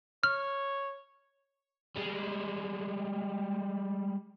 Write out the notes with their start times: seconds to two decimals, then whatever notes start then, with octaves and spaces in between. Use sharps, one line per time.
0.23 C#5 F6
1.96 G3 G#3